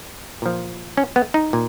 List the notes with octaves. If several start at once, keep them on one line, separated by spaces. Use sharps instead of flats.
A#2 F3
C#4
B3
D#4
A#2